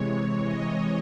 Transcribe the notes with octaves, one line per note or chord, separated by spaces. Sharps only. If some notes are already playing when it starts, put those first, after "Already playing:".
Already playing: C3 E3 G#3 C#5
D#5